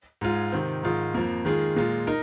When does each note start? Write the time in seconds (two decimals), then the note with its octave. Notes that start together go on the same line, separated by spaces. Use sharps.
0.21 G#2 G#3 F4
0.52 C3 D#3 C4
0.83 G#2 D#3 G#3 F4
1.14 F2 F3 A#3
1.45 D#3 G#3 F4 G#4
1.76 A#2 G#3 F4
2.07 D#4 A#4